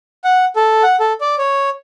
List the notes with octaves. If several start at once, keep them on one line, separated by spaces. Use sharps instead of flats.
F#5
A4
F#5
A4
D5
C#5